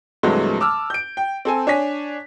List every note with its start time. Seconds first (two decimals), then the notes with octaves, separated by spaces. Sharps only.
0.23 G2 C3 E3 F#3 G#3 A3
0.60 A5 D6 E6 F6
0.90 G6 D7
1.17 G5
1.45 C4 A4 G#5
1.67 D4 C#5 G#5 B6